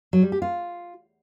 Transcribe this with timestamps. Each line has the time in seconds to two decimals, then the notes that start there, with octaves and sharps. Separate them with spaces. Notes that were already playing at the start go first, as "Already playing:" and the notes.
0.13 F#3
0.23 G3
0.32 G4
0.42 F4